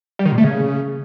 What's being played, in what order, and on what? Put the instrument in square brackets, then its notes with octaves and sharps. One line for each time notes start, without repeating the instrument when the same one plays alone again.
[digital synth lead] G3
D#3
A#2
A3
C#3